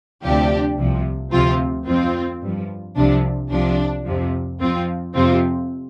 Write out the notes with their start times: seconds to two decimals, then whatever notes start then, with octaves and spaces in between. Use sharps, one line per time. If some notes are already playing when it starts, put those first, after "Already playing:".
0.23 D2 C3 F3 D4 G4
0.77 C2 C3 F3
1.32 D2 C3 F3 C4 F4
1.87 F2 F3 C4 F4
2.41 G2 F3
2.96 C2 C3 F3 D4
3.51 C2 C3 F3 D4
4.05 F2 C3 F3
4.60 F2 F3 C4 F4
5.14 F2 C3 F3 C4 F4